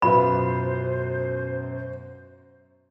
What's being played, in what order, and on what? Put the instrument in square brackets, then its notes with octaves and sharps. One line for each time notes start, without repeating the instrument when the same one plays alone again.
[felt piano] F#2 B2 [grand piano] F4 B4 E5 [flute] C5 [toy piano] B5